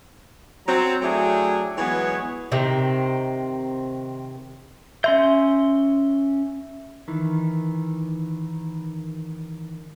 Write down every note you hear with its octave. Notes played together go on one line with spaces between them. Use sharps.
F#3 C4 A#5
F#3 A3 D4 E4 G#4 G5
E3 F#3 G#3 B3 G#4 C#5
C3 D#3 C4
C#4 E5 C6 G6
D#3 E3